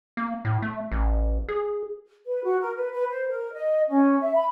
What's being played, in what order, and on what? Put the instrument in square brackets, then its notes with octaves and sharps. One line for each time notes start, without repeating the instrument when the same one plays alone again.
[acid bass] A#3
A2
A3
A1
G#4
[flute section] B4
F#4
A#4
B4
B4
C5
A#4
D#5
C#4
E5
B5